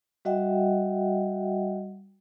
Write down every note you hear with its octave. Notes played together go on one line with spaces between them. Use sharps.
G3 F#4 D#5 E5 F#5 G5